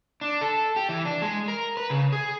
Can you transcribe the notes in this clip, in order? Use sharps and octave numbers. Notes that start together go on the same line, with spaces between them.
D4
A4
G4
E3
D4
G#3
A#4
B4
C#3
G#4